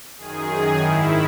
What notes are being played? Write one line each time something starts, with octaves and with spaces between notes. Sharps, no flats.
F#2 D#3 G#4
F#2 D#3
G#2 D#3 E4